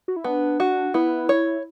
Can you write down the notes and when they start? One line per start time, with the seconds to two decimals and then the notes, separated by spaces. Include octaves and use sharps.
0.08 F#4
0.16 E4
0.24 B3 D4
0.60 F#4
0.94 B3 E4
1.29 C#5